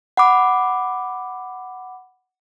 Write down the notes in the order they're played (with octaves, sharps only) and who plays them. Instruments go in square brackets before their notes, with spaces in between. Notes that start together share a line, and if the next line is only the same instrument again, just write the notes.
[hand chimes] F#5 B5 D6